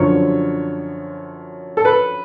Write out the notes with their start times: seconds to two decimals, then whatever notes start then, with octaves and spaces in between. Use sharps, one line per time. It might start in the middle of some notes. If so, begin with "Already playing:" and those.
Already playing: F#2 D3 F3 C#5
1.77 A4
1.85 B4